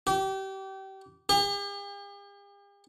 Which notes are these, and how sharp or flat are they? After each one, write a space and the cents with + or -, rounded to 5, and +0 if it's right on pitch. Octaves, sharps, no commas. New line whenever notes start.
G4 -30
G4 +45